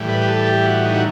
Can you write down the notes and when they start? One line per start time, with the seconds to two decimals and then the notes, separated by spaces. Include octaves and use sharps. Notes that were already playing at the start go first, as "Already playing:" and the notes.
Already playing: A2 E3 G3
0.09 B4
0.21 G4
0.28 A4
0.46 G4
0.66 F#4
0.85 D#4
0.94 F#4